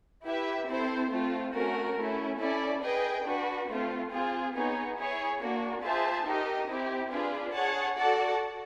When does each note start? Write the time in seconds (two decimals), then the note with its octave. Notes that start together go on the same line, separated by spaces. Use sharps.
0.24 E4 G4 B4 E5
0.67 C4 E4 A4 C5
1.10 A3 C4 F4
1.53 A3 C#4 F#4 A#4
1.96 A3 C#4 E4
2.39 C#4 E4 A4 D5
2.82 G#4 B4 D#5 G5
3.25 D4 F#4 B4
3.67 A3 C4 F4
4.11 C4 F4 G#4
4.53 B3 D#4 G#4 C#5
4.96 E4 G#4 C#5
5.39 A#3 D4 F#4
5.82 F4 G#4 C5 E5 A5
6.25 D#4 G4 A#4 D#5
6.68 C4 E4 G4
7.11 D4 F4 G#4 B4
7.54 G#4 C#5 F#5 A5
7.97 F#4 A4 D5 F#5 A5